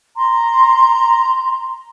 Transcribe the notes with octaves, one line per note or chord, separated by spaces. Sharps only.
A#5 C6